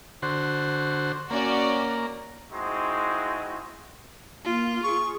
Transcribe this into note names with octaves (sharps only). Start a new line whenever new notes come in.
D3 F#4 C5
A#3 C#4 F#4 D5
G#3 C4 D#4 E4 F#4
A#3 F4
G#4 C#6